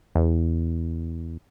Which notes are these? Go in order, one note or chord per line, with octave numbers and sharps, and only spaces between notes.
E2